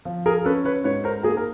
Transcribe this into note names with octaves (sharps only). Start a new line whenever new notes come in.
F3
G#4 A#4
C#4 A4 B4
B4 C#5
G#2 B4 C#5
A#4 C5
A#3 G#4 A#4
A#4